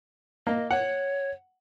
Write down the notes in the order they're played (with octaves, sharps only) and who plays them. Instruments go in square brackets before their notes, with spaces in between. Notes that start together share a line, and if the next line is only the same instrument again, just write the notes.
[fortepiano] A#3 [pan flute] D#5
[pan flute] C#5 [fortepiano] F#5